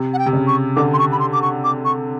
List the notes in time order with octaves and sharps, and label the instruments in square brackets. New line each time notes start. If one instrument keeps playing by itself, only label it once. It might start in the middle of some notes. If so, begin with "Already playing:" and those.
Already playing: [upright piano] C3
[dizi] F#5
G5
[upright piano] C3
C#3
[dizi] C#6
[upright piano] D3 [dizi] D6
[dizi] C6
C#6
B5
C6
D6
C#6
D6
C#6